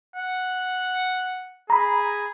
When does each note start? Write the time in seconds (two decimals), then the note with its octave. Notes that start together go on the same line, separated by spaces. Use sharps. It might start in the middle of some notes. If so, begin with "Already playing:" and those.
0.16 F#5
1.70 G#4 A#5 B5